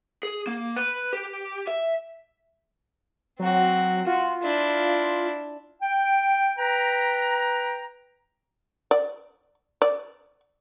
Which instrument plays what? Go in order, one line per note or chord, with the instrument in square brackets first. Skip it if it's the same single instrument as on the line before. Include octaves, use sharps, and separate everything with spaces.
[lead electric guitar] G#4
A#3
B4
G4
E5
[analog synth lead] F#3 [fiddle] C4 F#4
[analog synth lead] F4 [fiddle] F#4
[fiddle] D4 E4
[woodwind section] G5
B4 G5 A#5
[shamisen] D5
D5